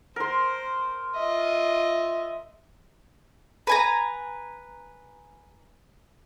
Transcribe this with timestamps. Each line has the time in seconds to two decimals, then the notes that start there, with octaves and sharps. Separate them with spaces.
0.16 A#4 C5 C6
1.15 F4 D#5 E5
3.67 B4 G#5 A#5